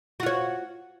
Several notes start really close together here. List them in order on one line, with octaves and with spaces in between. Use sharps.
F#4 F4 C#5